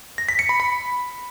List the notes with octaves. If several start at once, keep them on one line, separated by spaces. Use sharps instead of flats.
A#6
B6
C#7
B5
B5